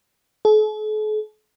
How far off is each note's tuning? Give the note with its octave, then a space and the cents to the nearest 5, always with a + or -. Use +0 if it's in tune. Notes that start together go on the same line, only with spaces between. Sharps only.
A4 -45